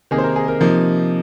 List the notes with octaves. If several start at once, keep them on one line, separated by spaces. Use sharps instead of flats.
C3 D#3 A#3 D#4 G#4
C5
A#4
G#4
A#4
C3 F3 A#3 D#4